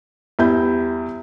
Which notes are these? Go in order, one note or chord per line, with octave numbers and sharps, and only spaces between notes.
E2 G3 E4 B5 G6